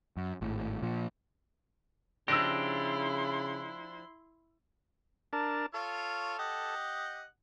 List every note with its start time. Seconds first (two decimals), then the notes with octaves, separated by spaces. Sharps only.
0.17 F#2
0.41 G#1 A2
0.82 A#2 F3
2.28 C#3 F3 D4 E4 G4 C6 E6 A#6
5.33 D4 A#4 A5
5.74 F4 A4 C#5 F5
6.39 G4 D#5 F#5